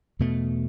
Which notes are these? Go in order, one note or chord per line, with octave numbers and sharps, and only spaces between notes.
E2 B2 A3